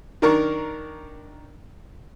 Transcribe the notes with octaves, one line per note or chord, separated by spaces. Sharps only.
D#3 D4 A#4 C#6